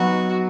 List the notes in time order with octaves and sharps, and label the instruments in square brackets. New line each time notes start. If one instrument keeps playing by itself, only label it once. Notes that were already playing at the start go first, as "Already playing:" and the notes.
Already playing: [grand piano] F#3 B3 D#4 [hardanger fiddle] F#4